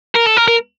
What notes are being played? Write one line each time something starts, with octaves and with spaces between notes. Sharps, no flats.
A#4
A4
A#4
A#4